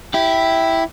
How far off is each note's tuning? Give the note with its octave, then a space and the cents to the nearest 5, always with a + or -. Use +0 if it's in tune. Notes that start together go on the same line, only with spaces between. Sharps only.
E4 +0 G4 -10